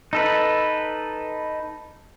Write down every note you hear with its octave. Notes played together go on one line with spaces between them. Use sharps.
D#4 A4 B4